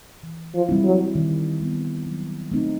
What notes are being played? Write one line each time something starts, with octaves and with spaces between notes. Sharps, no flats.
E3
F3
G3 C4 E4
F#3
D#3
G3 B3
F#3
A3 C4 D#4